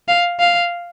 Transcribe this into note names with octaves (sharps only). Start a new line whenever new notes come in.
F5
F5